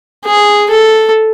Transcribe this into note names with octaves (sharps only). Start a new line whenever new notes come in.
G#4
A4